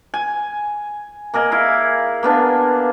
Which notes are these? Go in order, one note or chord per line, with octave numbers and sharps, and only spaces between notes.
G#5
A#3 G#4 A#4 D#5
E4 F5
A#3 B3 D4